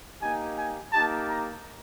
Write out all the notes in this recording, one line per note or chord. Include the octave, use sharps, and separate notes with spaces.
A#3 D#4 G4 G#5
G#5
A#3 D#4 G4 A5
A#5